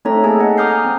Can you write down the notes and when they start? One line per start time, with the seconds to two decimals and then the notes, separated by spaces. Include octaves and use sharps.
0.05 A3 C4 D#4 A4 C#5 A#5
0.24 A#3 D#4 G#4 G#5 A5
0.39 A4 D#5 F#5
0.57 A#5 D6 D#6 F6 G6 C7
0.71 G#5
0.85 C4